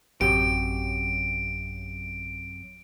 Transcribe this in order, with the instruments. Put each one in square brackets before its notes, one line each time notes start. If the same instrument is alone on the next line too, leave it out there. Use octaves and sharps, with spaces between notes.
[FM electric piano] A1 [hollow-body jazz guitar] F#2 C3 G4 [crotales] D7